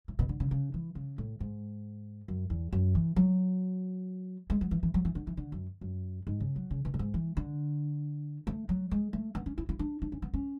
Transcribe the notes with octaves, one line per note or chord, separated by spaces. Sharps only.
A2
B2
D3
C#3
C#3
E3
C#3
A2
G#2
F#2
E2
F#2
E3
F#3
G#3
F#3
E3
E3
F#3
E3
D3
E3
D3
F#2
F#2
G#2
C#3
F#3
C#3
B2
A2
G#2
E3
D3
A3
F#3
G#3
A3
B3
C#4
E4
E4
D4
D4
C#4
B3
C#4